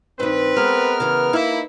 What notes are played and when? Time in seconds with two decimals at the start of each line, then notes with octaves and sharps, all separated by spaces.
0.20 G2 D#3 C4 B4
0.56 G#3 B3 A#4 F6
1.00 C#3 E3
1.33 A#3 D#4 E4